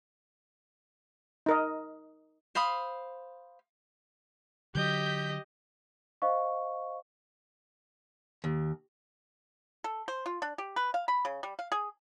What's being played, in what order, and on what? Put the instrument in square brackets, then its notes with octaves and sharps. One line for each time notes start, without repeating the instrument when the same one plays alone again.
[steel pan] D#4 A#4 D#5
[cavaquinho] C5 F5 B5 D#6
[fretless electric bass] D3 F#3 [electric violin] G4 D#5 [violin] G6 B6
[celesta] C5 D#5 F5 C#6
[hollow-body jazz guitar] D#2
[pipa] A4
C5
F4
D4
G4
B4
F5
B5
C#3
G3
F5
G#4